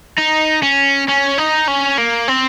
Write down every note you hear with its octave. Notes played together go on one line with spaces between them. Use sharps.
D#4
C#4
C#4
D#4
C#4
A#3
C4